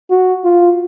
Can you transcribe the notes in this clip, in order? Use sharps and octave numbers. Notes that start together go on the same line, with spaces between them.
F#4
F4